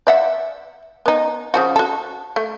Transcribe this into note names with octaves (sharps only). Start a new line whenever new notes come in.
D5 E5 F#5
B3 D#4
C#3 F3 F#4
F#4 A4
A3